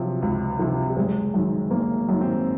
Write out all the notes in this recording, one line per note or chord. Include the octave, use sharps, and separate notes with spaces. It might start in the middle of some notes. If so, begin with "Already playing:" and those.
Already playing: C3 F3 F#3
C#2
C3 F3
G3
F#1 G#3
F#2 D#3
F#1 A#3
F#2 D#3
C4